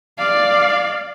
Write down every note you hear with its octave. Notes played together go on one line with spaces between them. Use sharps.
D5 F5